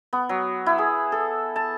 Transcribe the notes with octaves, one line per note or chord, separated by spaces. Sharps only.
B3
F#3
E4
G#4
A4
A5